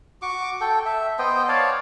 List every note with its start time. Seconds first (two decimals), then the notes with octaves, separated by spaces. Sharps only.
0.22 F#4 C#6 D6
0.61 A4 G5
0.86 E5
1.19 B3 C5 D#5 G5
1.48 C#5 D5 F5 A5